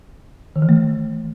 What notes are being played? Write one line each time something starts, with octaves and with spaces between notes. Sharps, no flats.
D#3
E3
A3